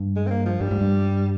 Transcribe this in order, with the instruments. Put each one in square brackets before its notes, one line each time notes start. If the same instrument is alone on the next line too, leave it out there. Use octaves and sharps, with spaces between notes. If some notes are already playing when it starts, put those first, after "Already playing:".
Already playing: [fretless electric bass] G2
[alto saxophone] G#3
C4
A#3
F3
[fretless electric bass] G2 [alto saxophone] G3
[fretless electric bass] G#2
G2